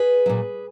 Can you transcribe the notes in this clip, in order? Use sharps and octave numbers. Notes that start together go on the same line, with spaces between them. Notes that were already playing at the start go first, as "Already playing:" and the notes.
Already playing: G#4 B4
A#2 F#3